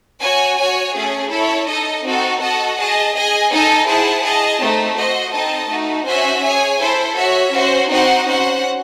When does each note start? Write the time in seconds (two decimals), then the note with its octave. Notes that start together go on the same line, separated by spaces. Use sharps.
0.22 F#4 C#5 G#5
0.58 F#4 C#5 G#5
0.95 A3 C#4 G#4
1.31 E4 A4 C#5
1.68 D#4 A4 D#5
2.05 C4 D#4 F#4 A4
2.41 F#4 A4 D#5 F#5 A5
2.77 G#4 D#5 A5
3.15 G#4 D#5 G#5
3.51 D#4 A4 D#5 G#5
3.87 E4 G#4 C5 F#5 A5
4.24 G#4 D#5 A5
4.60 A3 C4 D#4
4.97 F#4 C5 D#5
5.33 C4 D#4 A4 D#5 A5
5.70 A3 D#4 F#4
6.06 C#4 F#4 C5 E5 G#5
6.43 G#4 C#5 G#5
6.80 E4 A4 C5
7.17 F#4 C#5 E5
7.52 C#4 F#4 C5
7.90 C4 D#4 F#4 C5 F#5
8.27 C#4 F#4 C5 F#5